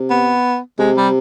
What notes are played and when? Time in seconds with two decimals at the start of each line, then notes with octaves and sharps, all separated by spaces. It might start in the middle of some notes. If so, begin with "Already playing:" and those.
Already playing: C3
0.10 B3
0.79 C3 G#3
0.97 G3